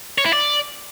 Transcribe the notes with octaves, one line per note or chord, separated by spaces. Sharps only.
C#5
E4
D5